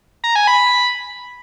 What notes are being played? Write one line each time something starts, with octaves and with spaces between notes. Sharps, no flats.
A#5
G#5
B5